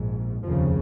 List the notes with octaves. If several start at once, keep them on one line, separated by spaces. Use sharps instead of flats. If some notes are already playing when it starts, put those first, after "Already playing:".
Already playing: A#1 G#2
F1 D#2 C#3 F3